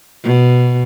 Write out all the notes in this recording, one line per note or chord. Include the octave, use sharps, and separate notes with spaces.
B2